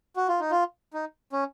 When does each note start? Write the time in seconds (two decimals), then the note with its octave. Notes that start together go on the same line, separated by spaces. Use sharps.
0.16 F#4
0.28 F4
0.40 D#4
0.51 F4
0.93 D#4
1.32 C#4